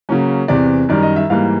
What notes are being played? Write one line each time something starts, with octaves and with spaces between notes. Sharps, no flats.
C#3 F#3 A#3 C#4
E2 C3 E3 D5
F#2 D#3 G3 D5
D#5
E5
G#2 E3 G3 A#3 F5